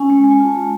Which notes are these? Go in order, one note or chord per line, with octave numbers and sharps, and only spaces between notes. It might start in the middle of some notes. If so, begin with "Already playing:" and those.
Already playing: C#4 G#5
G#3
G#3
G#5
F4 A5
G#3